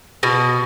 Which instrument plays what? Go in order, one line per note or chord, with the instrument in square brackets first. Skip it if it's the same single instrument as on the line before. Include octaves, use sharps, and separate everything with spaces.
[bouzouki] B2